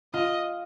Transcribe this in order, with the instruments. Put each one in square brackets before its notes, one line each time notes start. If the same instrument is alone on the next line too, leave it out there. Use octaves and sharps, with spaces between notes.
[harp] F4 [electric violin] D#5